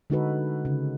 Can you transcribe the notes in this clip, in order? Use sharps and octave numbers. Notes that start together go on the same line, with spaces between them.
D3 G#3 D#4 F#4 A4 B4
C#3